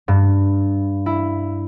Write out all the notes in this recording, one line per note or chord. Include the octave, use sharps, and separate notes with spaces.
G2
E4